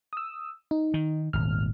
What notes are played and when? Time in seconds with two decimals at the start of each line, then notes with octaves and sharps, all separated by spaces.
0.13 D#6 E6
0.71 D#4
0.94 D#3
1.33 D#1 G#1 F6